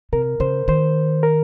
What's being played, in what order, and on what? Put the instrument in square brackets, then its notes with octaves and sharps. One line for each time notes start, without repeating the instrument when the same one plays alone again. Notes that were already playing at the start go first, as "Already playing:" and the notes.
[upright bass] C3 [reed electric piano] A#4
[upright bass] C#3 [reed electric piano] C5
[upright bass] D#3 [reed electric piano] C5
[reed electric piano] A#4